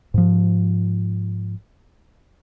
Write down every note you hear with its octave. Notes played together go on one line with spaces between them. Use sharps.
G#2 F3